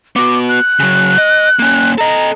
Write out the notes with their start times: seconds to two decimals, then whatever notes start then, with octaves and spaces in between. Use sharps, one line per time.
0.16 B3 F#4 D6
0.49 F#6
0.80 C#3 F#3
1.18 D#5
1.59 A#3 C#4
1.98 A4 D#5 A#5